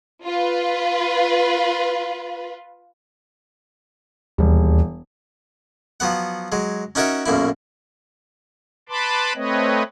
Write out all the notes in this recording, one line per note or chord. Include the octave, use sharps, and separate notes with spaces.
F4 B4
E1 D#2 G3
F3 F#3 B3 F#5
F#3 G#3
C#4 D#4 F#4 A#4 C#5 E5
B1 F#2 A#2 E4
B4 A5 B5 C6 D6
A3 C4 B4 C#5 D#5